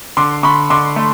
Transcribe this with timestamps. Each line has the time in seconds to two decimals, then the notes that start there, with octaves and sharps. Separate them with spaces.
0.17 D3 C6 D6
0.43 D3 B5 C#6
0.70 D3 C6 D6
0.96 A3